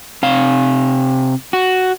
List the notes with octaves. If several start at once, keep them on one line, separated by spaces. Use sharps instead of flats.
C3 F5
F#4